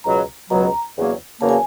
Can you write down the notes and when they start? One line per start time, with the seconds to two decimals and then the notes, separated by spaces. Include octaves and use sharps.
0.04 C#2 B2 F#3 A#5
0.50 C#2 B2 F#3 A#5
0.96 E2 C#3 F#3 A#3
1.40 E2 C#3 F#3 A#3 A5
1.49 G#5